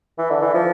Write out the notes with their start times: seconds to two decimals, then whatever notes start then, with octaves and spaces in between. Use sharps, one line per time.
0.18 E3
0.30 D3
0.42 E3
0.54 F3